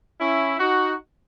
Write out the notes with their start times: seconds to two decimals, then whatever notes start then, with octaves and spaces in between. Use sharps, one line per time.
0.20 C#4 E4
0.60 D#4 F#4